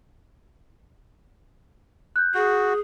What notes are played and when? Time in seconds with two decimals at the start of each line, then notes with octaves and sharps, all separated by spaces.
2.16 F#6 G6
2.35 F#4 G#4